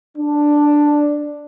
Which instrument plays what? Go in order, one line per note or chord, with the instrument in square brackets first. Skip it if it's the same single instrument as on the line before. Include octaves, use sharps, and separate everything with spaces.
[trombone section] D4